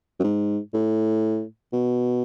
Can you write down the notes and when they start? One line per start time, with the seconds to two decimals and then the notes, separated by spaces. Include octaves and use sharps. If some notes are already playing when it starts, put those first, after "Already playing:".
0.20 F#2
0.24 G#2
0.74 A2
1.73 B2